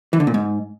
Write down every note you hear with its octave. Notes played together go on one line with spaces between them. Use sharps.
E3
D3
A#2
G#2